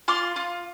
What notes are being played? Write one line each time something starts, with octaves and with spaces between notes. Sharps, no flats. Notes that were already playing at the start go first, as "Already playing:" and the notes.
F4 C6 D6
F4